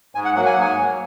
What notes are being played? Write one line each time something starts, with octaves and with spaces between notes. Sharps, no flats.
G#2 G#5
F#5
F#3 A#3 F#5
G#5
G#2 F#5
G#5
F#3 A#3